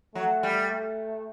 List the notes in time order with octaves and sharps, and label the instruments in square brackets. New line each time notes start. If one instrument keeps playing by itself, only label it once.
[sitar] F#3 [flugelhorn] A3
[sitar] G3
[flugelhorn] A3